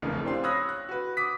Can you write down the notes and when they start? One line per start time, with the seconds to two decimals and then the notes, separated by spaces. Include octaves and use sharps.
0.02 F1 A#1 F2 C#3 E3 A#4
0.25 C4 D4 G4 F5 C6
0.43 C#5 B5 D#6 E6 F#6 A#6
0.69 F#6
0.89 F#4 B4
1.17 D6 D#6 B6